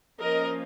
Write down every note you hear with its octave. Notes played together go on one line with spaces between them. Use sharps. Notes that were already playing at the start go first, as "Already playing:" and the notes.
F3 A#3 C#4 A#4 D#5